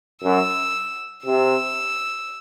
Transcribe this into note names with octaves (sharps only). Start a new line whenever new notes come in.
F#2 E6
C3 E6